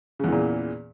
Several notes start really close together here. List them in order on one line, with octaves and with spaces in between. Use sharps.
C#3 E2 E3 A#2